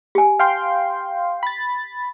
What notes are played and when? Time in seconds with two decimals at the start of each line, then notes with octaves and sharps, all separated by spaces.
0.15 G4 G#5
0.39 F5 G5 C6
1.43 B5 A6